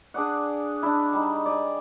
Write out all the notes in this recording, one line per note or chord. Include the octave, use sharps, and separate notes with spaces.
D4 G#4 D5 F#5
D4 E4
G3 D#4
D5 G#5